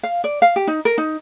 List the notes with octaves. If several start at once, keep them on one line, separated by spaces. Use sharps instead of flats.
F5
D5
F5
G4
D#4
A#4
D#4